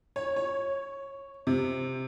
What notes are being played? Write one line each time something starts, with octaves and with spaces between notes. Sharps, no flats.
C#5
C#5
C3